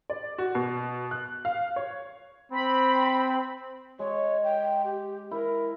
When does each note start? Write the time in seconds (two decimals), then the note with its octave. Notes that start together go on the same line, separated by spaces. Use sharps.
0.10 D5
0.38 F#4
0.55 B2
1.11 F#6
1.45 F5
1.76 C#5
2.52 C4 B5
3.99 G#3 C#5
4.44 G5
4.85 G4
5.31 E4 A#4